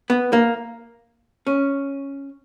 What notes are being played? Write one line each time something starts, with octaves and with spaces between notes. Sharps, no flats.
B3
A#3
C#4